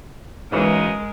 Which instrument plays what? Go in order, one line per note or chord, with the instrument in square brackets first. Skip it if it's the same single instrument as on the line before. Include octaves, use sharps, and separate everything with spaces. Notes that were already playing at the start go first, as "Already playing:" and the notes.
[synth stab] G#2 E3 [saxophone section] C#3 F#3 D#4 [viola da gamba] G#3 A#4